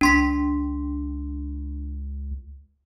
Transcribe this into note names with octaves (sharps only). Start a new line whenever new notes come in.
C#2 D4 C6 B6